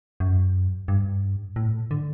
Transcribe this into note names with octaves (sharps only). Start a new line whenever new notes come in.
F#2
G2
A2
D3